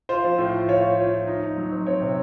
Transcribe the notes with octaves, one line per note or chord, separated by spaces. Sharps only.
F4 C5
F3
A2
F4
F4 C#5
F4
F4
F3
D#4
D#4
F#3
C4
C4 C#5
C3